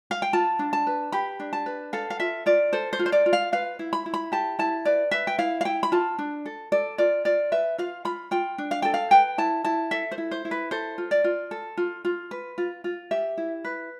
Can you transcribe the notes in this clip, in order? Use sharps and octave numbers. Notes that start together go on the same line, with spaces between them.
F5
G5
F4 A5
D4
A5
B4
G4 B5
D4
A5
B4
A4 F5
F5
F4 E5
F4 D5
A4 C5
C5
F4
C5
D5
F4
F5
B4 F5
E4
B5
E4
B5
G4 A5
E4 A5
B4 D5
B4 E5
G5
E4 F5
F5
E4 G5
B5
F4 A5
D4
A4
A4 D5
F4 D5
F4 D5
B4 E5
F4 F5
F4 B5
F4 G5
D4
F5
A4 G5
F5
B4 G5
E4 A5
E4 A5
A4 E5
C5
E4
C5
E4
B4
A4 C5
F4
D5
F4
A4
F4
F4
B4
F4
F4
G4 E5
E4
B4